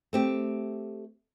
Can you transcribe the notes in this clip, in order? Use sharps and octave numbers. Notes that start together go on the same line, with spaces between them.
A3 C4 G4